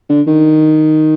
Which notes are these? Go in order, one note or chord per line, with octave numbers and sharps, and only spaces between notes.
D3
D#3